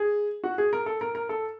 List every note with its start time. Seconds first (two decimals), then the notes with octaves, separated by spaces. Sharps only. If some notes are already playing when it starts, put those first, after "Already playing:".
Already playing: G#4
0.44 F#4
0.58 G#4
0.73 A#4
0.86 A4
1.01 A#4
1.15 A#4
1.29 A4